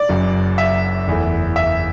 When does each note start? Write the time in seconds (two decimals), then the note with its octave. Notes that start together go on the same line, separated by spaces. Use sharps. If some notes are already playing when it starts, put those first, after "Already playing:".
Already playing: D5
0.09 F#1 F#2 F#3
0.58 E5
1.07 F#1 E2 E3 A3
1.56 E5